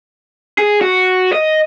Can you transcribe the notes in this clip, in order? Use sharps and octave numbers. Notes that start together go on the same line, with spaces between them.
G#4
F#4
D#5